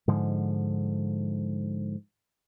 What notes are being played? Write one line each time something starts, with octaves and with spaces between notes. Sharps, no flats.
G#2 D3 F3